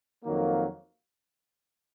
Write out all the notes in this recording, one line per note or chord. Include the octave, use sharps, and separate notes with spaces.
F2 D#3 F#3 A#3